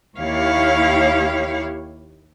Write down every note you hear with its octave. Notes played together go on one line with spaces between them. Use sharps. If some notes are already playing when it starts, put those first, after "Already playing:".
D#2 E4 G4 C#5 F5